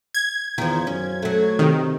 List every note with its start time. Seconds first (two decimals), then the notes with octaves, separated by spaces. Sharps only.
0.15 G#6
0.58 E2 D#3 F3
0.87 F#2 C#4
1.23 F#3 A3
1.59 C3 D#3